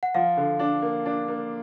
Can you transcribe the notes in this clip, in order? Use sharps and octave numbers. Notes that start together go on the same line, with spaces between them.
F#5
F3 F5
D3
D4
A#3
D4
A#3